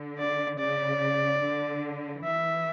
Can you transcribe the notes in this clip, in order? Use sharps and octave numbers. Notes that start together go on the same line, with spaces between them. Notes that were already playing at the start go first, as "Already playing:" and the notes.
Already playing: D3
D5
C#3 D5
D3
E3 E5